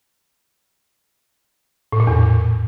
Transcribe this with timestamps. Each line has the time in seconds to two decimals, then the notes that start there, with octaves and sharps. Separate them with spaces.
1.93 A2
2.00 A#2
2.07 E2